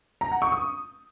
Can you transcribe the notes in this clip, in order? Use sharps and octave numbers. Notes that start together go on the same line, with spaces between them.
A#5
F#5
C#6
D#6